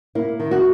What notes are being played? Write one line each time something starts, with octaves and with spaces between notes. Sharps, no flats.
A#3 E4
D#3
F#4